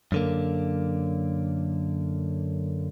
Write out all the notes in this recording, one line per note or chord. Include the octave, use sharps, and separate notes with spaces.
F#2 D3 A#3